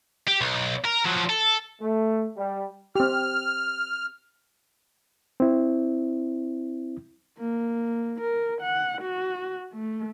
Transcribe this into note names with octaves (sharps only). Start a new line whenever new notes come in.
G4
B1
A#4
F3 F#3
A4
A3
G3
C4 G4 F6
C4 E4
A#3
A#4
F#5
F#4
A3